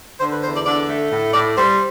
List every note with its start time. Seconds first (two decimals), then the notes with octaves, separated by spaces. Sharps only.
0.20 D3 C5
0.32 B4
0.44 E2 C5
0.55 D5
0.65 D3 D5
0.89 A3
1.11 A2
1.34 A2 D5
1.57 G3 C5